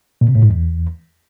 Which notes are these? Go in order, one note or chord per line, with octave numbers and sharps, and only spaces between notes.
A#2
C3
A2
G#2
E2